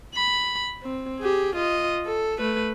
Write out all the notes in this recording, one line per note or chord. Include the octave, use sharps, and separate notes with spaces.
B5
C4
G4 G#4
F4 D#5
A4
A3 B4